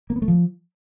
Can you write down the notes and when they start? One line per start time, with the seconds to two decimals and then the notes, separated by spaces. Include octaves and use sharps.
0.10 A#3
0.16 B3
0.22 A3
0.28 F3